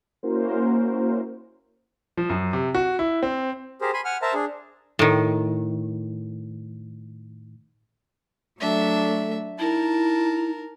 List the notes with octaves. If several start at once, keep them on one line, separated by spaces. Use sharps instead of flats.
A#3 C#4 E4 F#4 A#4 C5
F3
F#2
C3
F#4
E4
C4
G4 G#4 A#4 C5
G#5 B5 C6
F#5 G#5 F6
A#4 C5 E5 A5 A#5
D4 G#4
A2 D#3
F#3 A3 D4 E5
D#4 E4 A#4 A5